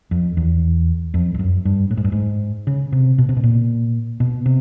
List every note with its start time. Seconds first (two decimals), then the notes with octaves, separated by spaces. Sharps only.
0.11 F2
0.37 E2
1.14 F2
1.34 F2
1.39 F#2
1.65 G2
1.91 A2
1.97 G#2
2.04 G2
2.12 G#2
2.67 C#3
2.92 C3
3.18 B2
3.29 C3
3.37 B2
3.43 A#2
4.20 B2
4.46 C3